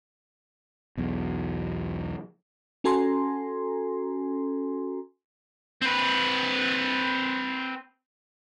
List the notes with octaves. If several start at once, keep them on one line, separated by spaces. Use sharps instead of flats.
B1 E2
C#4 F#4 A4 G#5 A#5 C6
C4 B4